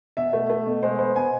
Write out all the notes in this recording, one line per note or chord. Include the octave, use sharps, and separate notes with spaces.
B2 E5
A3
A3
B2
G#3 C5
B3 C5
B2 G#5